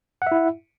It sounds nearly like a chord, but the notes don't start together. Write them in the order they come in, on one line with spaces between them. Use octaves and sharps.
F#5 E5 E4